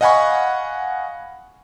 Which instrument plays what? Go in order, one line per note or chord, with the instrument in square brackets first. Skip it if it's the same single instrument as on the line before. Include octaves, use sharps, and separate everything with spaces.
[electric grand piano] D#5 F5 F#5 G#5 B5 C#6